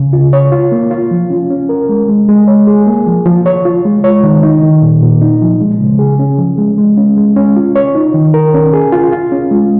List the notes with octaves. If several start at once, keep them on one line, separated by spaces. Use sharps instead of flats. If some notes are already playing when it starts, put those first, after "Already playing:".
Already playing: C#3
F4
C#5
F4
A#3
F4
F3
C#4
C#4
A#4
G#3
G#3
G#3
C#5
G#4
A#3
F3
F3
C#5
F4
G#3
C#5
D#3
D#4
D#3
A#2
A#2
D#4
F3
G#3
C#3
G#4
C#4
F3
G#3
G#3
C#4
G#3
C#4
F4
C#5
D#4
D#3
A#4
C#4
G#4
F4
F4
C#4
G#3